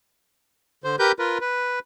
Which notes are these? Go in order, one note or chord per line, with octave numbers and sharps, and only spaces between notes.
D3 C5
G4 A#4 B4 G6
F4 A#4 B4
B4